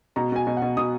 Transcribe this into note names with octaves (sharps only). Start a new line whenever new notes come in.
B2 A#5
B2 G#5
B2
F#5
B2
B2 D#6